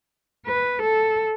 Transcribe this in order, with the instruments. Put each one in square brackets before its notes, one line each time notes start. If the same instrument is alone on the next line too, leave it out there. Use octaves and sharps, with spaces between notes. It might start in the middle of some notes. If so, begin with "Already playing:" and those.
[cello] B4
A4